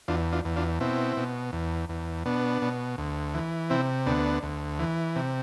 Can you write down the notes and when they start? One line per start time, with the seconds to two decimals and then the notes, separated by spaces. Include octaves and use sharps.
0.08 E2 D4 F4
0.32 D4 F4
0.45 E2
0.56 D4 F4
0.80 B2 C4 E4
1.17 B2
1.53 E2
1.89 E2
2.25 B2 B3 D4
2.62 B2
2.98 D2
3.34 E3
3.70 C3 C4 E4
4.06 D2 B3 D4
4.43 D2
4.79 E3
5.16 C3